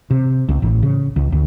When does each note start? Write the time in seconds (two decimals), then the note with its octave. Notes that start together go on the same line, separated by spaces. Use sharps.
0.11 C3
0.49 C#2
0.62 A1
0.83 C#3
1.16 C#2
1.32 D2